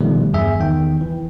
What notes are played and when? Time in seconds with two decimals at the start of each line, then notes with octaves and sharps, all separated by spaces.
0.01 B2 D3 D#3 F3 G3 A3
0.33 E2 G2 G#4 E5
0.59 E2 D#3 G5
1.01 E3